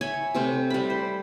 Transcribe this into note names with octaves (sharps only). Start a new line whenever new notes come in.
C#5 E5 G#5 B5
C3 A3 C4
G3 B5
C5